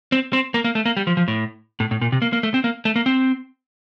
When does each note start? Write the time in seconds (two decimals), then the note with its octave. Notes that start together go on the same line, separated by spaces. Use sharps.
0.12 C4
0.33 C4
0.54 A#3
0.64 A#3
0.75 A3
0.85 A#3
0.97 G3
1.07 F3
1.17 F3
1.28 A2
1.80 A2
1.91 A2
2.01 A#2
2.12 C3
2.22 A#3
2.33 A#3
2.43 A3
2.54 C4
2.64 A#3
2.85 A3
2.96 A#3
3.06 C4